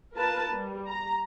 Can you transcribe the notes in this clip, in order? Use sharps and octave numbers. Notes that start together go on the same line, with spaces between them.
F4 A#4 B4 A5
G3
A#5